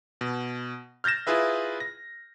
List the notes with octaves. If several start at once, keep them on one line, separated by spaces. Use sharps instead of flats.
B2
F6 G6 A6 A#6 E7
E4 F4 G#4 B4 E5
A#6